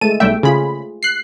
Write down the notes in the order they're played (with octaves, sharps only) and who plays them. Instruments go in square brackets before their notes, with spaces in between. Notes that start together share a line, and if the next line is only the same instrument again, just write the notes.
[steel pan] G#3 A3 A5 [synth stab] D#7
[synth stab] B1 G3 E5 [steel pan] A3 G5
[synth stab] C#3 B5 [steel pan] F4 G#4
[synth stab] F#6 C7